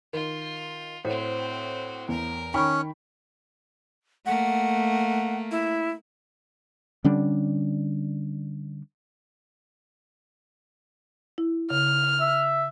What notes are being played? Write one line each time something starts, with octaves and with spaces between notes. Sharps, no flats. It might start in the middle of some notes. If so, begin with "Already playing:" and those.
D#3 F4
A2 C4 F#4 C5
E2 A#4
D#3 C#4 G5 B5 C#6
A3 A#3 F#5
E4
D3 G3 C#4 D4
E4
C#3 F6
E5